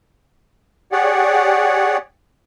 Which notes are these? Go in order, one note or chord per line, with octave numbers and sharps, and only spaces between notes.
G4 G#4 C#5 D5 F#5